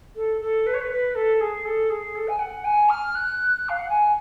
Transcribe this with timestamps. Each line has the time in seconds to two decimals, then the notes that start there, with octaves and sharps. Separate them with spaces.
0.15 A4
0.40 A4
0.66 B4
0.73 C#5
0.80 B4
0.91 B4
1.14 A4
1.40 G#4
1.65 A4
1.89 G#4
2.15 A4
2.28 G#5
2.39 F#5
2.64 G#5
2.89 F6
3.14 F#6
3.68 F5
3.78 F#5
3.89 G#5